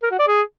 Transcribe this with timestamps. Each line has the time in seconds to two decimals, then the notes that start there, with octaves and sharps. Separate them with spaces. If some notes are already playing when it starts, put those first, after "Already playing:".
0.03 A#4
0.11 F#4
0.19 D5
0.28 G#4